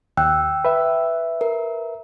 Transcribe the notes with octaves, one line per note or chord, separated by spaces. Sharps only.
D#2 G5 E6 F#6
B4 E5
A#4